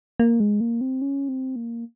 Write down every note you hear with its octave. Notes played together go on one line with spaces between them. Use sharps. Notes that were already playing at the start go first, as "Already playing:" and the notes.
A#3
G#3
A#3
C4
C#4
C4
A#3